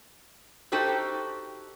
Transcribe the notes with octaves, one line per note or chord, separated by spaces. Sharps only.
D#4 F#4 G4 A4 C5